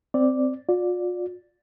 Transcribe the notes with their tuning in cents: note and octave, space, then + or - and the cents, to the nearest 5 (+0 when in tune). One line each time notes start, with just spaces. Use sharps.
C4 -10 D5 +0
F4 +40 D5 +0